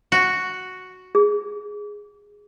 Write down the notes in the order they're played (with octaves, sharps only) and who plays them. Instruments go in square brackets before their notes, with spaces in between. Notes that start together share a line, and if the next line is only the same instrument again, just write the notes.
[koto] F#4
[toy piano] G#4